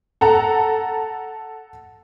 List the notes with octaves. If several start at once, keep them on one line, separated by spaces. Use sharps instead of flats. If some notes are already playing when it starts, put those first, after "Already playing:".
A4 F#5 A#5